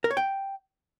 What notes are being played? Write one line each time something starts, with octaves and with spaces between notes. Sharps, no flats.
A#4
C#5
G5